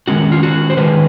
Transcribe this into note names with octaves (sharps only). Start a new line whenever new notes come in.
D#3 G#3 C#4 F#4
F4
F#4
C5
D#3 G#3 C#4 B4